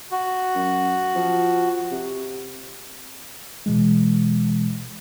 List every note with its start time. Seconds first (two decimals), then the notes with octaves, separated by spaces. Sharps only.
0.11 F#4
0.55 F#2
1.16 F3
1.92 C3
3.66 B2 E3 G#3